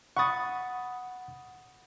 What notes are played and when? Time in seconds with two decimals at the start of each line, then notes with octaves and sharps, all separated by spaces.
0.17 F#5 B5 C#6 D#6 A6